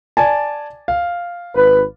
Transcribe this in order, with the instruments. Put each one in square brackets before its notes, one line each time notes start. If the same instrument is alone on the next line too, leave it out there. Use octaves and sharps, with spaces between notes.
[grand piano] D5 G#5 A5
F5
[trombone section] G#1 B4